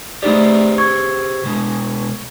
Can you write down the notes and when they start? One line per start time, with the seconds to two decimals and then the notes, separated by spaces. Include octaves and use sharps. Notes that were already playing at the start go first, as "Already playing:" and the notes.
0.23 A3 D#4 G4 G#4 C5 D5
0.78 C#6 G#6
1.44 B2 G#3